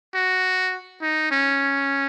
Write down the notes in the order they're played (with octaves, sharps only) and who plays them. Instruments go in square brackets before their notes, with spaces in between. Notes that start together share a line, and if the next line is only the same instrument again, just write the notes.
[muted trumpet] F#4
D#4
C#4